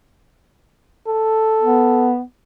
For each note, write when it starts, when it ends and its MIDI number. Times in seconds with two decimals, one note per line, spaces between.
1.08 2.12 69
1.62 2.20 59